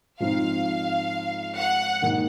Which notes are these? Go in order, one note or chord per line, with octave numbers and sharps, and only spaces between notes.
G#2 F3 C4 D#4 F5
F#5
G#2 D#3 F#3 A#3